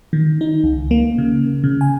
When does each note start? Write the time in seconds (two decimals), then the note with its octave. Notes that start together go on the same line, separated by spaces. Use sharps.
0.13 D#3
0.41 D#4
0.64 C#2
0.91 A#3
1.18 C#3
1.64 C#3
1.81 G#5